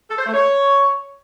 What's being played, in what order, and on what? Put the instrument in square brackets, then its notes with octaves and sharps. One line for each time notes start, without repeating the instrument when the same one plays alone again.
[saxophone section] A4
C5
A3
C#5